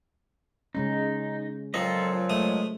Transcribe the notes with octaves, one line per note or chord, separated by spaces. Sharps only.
C#3 G#3 C#4 D#4
A#2 F3 F#3 C4 F4 A4 D#5
G#3 A3 D#6